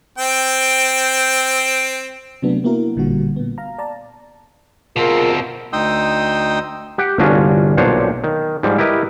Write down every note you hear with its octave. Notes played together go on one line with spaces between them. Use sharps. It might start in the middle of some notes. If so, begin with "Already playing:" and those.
C4 G5
C3 F#3 A3 B3 D4
A#3 B3 E4 F#4 A#4
A1 A#2 D3 G3 F#4
A#2 B3
F5 A#5
D5 A5 A#5
B2 C4 F4 G#4 A#4
D2 D#4 G5 C6 D#6 E6
G4 F#5 G5
G1 C2 C#4 D4 F4 F#4
B1 A#2 D4 C5 C#5
D#3
G#2 F3 G3
E4 G4 A#4 B4 D#5